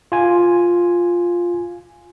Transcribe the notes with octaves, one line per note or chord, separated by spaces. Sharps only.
F4 G#5